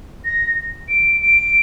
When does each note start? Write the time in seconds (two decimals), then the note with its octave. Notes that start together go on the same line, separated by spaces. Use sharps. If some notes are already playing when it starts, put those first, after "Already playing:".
0.25 A#6
0.89 D7
1.21 D7